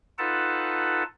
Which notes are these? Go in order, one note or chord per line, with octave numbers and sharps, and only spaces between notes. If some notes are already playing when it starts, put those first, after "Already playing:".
D#4 F4 A4 B4 F#5 A5